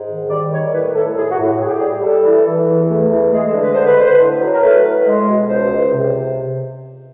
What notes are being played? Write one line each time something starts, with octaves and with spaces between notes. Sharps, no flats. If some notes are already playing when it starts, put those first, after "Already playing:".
Already playing: G#2
D#3
G3 D5
D#3 C#5
A2 B4
A2 A4
A2 G#4
F#4
A2
G4
A2 G#4
G4
G#4
G3
G3 A4
E3
E3
E2
A3
E3
G#3 G#4
A4
D3
B4
D3 C5
B4
D3 C5
B4
A2
F#3
A#4
A3 B4
A2
G#3
B2
C#2 C5
C#2
C3